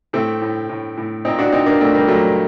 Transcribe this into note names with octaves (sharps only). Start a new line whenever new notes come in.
A2 A3 C4
A2
A2
A2
A#2 C4 D#4
D4 F#4
A#2 C4 D#4
A#3 D4
A#2 A3 C4
G3 A#3
A#2 F#3 A3